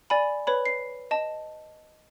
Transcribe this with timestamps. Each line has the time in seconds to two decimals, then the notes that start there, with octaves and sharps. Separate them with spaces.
0.10 D5 G#5 B5
0.47 B4 C#5 B5
0.66 C7
1.11 D#5 A5